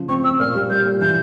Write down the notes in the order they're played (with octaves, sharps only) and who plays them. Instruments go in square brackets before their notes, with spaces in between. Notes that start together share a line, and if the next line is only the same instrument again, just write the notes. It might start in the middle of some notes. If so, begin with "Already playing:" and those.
Already playing: [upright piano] C#3 F3
[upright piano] C4 [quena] C#6
[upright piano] C4 [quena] E6
[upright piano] A#2 [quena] F6
[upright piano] G3
[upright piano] G3 [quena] G6
[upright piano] A#2
[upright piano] E3 [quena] G6